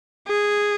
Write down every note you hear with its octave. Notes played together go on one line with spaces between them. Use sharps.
G#4